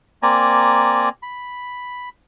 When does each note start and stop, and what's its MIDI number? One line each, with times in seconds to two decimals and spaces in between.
0.23 1.09 58
0.23 1.09 60
0.23 1.09 74
0.23 1.09 80
0.23 1.09 82
1.23 2.09 83